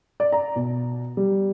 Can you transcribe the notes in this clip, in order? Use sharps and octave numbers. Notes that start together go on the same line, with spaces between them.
D5
A#5
B2
G3